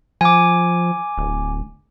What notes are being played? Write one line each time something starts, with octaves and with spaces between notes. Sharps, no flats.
F3 G#5 D6
D1